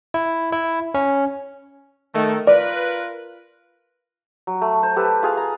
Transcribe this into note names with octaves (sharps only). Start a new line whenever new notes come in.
E4
E4
C#4
D#3 A3
F4 A#4 B4 D5
F#3
A3
C5
G4 A4 B4
F4 G#4 F5
A#5